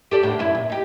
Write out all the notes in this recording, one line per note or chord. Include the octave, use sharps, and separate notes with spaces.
G4 A4 D5
A2 D3
F#2 E4
A#2
D#4 G4